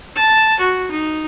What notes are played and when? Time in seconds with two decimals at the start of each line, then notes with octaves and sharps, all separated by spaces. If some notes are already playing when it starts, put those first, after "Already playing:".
0.16 A5
0.59 F#4
0.91 D#4